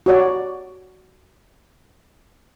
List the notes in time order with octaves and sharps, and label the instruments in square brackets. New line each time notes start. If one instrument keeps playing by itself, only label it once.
[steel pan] F#4 C#5 D5